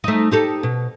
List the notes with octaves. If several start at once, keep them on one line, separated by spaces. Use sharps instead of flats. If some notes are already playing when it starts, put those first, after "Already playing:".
A3 D#4
D#4 G4 A4
B2